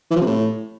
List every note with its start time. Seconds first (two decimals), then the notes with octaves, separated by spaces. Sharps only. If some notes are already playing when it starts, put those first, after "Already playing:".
0.11 E3
0.16 F3
0.21 C3
0.26 A2